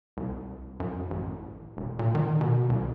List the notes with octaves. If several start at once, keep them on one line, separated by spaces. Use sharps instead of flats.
C2
F#2
A1
E1
A#2
D#3
B2
C2